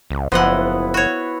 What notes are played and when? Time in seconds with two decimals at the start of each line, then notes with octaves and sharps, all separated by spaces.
0.11 C#2
0.32 F#1 F3 B3 E4 D#5 F#5
0.94 F#4 C#5